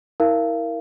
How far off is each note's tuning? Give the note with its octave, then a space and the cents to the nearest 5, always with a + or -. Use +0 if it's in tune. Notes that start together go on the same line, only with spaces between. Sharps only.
E4 -30 A#4 +0 F5 -35